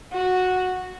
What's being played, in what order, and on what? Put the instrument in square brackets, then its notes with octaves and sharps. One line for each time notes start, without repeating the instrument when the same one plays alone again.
[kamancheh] F#4